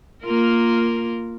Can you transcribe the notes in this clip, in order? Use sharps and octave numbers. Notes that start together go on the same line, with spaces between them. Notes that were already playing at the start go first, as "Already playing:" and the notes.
A#3 F4 A#4